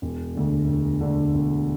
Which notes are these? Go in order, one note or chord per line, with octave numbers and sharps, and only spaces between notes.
E1
D2 D3
E1
D2 D3
E1